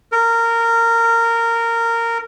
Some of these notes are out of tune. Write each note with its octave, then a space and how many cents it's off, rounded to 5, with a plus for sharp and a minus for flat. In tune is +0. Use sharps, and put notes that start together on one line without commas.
A#4 -15